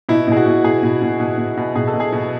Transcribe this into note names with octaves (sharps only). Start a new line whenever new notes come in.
B2 E4
B2 G#4
F#4
B2
B2 G#4
B2
B2
B2
B2
B2
B2 G#4
A4
B2
G#4
B2